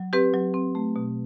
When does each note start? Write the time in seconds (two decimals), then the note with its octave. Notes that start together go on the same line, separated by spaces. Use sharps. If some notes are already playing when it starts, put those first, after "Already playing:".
Already playing: F#3
0.13 C4 G4 B4
0.34 F#3
0.54 C4
0.75 A3
0.96 B2